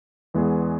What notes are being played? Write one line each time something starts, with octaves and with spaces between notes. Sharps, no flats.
E2 E3 G#3 B3 G#4